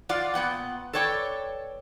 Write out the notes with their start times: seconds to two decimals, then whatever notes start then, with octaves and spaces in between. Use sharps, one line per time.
0.09 F4 D5 F5 F#5
0.34 A#2 B3 F#5 G5
0.93 A4 B4 C#5 D5 G5